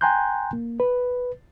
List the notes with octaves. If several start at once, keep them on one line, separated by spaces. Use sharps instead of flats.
G5 G#5 A#5 C6 F#6 G6
A#3
B4